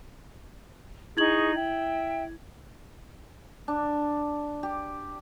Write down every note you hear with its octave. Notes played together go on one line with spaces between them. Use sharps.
D#4 E4 G#4 C#6 G#6 F#7
E5 G5
D4
G4